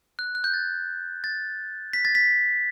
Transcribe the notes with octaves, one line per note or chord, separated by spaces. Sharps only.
F#6
F#6
G6
A6
A6
B6
A6
B6